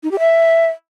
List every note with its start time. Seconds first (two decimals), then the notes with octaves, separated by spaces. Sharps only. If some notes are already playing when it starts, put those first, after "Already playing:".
0.03 D#4
0.11 G4
0.19 E5